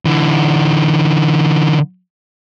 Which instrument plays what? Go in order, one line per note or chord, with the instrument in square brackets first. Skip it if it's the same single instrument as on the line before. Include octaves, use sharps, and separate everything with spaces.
[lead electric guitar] D3 E3